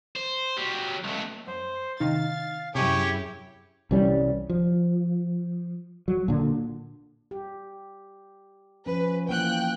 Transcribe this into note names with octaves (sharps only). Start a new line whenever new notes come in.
C5
F#3 G4
C#2 A2
F#2 C5
C3 D#3 D#4 F5 A6
F#2 C3 E4 G4 G#4 C#5 C#6 D#7
C2 E3 G3 C#4
F3
F#3
A#2 D3
G4
F3 C#4 B4
E3 A#3 F#5 G5 F#6